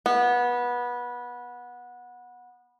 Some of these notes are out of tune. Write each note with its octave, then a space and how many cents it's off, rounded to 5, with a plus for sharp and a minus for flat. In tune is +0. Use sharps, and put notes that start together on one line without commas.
B3 -20